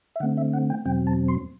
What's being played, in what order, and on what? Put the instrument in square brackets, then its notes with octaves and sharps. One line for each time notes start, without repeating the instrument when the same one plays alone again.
[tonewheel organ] E5
D3 F#5
A3 C4
E5
F#5
G5
E2 B2 F#3 C4 G5
A5
C6